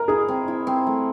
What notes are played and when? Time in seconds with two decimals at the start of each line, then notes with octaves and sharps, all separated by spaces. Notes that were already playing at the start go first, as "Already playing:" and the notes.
Already playing: A#4
0.08 E4 G#4
0.28 C4
0.48 E4
0.67 C4
0.87 A3